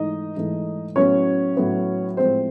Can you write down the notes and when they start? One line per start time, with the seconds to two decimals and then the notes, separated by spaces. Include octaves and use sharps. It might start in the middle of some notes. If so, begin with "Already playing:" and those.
Already playing: G#2 E3 A3 D#4 D#5
0.36 G#2 E3 A3
0.96 A2 F#3 B3 C#4 C#5
1.57 A2 F#3 B3
2.17 A2 F3 G#3 C4 C5